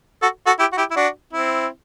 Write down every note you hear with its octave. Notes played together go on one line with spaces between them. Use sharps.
F#4 A4
F#4 A4
E4 G4
F#4
E4 G4
E4
D4 F#4
C4 E4